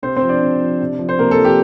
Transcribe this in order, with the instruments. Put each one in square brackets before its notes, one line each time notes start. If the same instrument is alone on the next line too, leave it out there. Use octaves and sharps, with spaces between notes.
[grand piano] C3 C4 C5
C4 C5
F3
D4 D5
C3
F3
C3
F3
C5
C3 A#3 A#4
A4
F3
G4